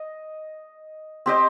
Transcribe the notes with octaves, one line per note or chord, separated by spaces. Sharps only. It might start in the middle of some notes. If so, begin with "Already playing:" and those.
Already playing: D#5
C4 G4 C5 D#5